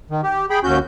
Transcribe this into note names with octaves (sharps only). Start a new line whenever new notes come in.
D#3
G4
G#4 G5 B5
D#2 C#4 F#4 G6